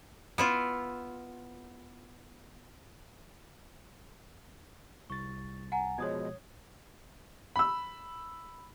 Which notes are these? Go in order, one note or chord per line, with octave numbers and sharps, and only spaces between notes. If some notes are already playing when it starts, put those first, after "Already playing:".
B3 E4 F4
C2 C#6 A6
F#5 G#5 A#5
B2 F3 G#3 C#5 D#6 G#6
B5 E6